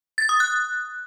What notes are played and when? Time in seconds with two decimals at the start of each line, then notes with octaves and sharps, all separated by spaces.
0.18 A6
0.29 D#6
0.40 F#6